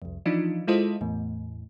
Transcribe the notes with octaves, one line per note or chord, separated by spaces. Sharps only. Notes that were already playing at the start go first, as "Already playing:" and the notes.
C2 F2
E3 F3 D4 D#4 F4
G#3 E4 F4 A4 C5 D#5
E2 A2